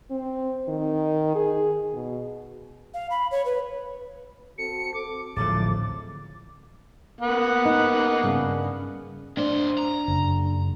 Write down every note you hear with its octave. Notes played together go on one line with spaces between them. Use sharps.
C4
D#3
G#4
B2
F5
B5
C#5
B4
C4 F#4 A4 C#7
C4 A4 D6
D1 A1 C#3 F3 G#3 A3 D6 A6
A#3 B3 F#5
D#4
G2 C#3
G2 D4 C5
A#5
F#1